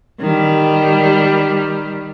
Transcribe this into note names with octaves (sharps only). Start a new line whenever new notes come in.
D#3 G3